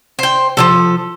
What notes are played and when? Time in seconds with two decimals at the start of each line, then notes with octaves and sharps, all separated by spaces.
0.19 C5 G5
0.57 F3 F#3 A4